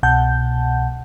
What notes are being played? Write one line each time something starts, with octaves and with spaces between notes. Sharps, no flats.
C2 B2 F#5 A5 G6